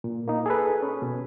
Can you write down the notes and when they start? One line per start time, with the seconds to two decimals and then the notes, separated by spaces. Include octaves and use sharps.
0.04 A#2
0.28 A#3 D#4
0.46 G#4 A4 B4
0.82 C#4
1.02 B2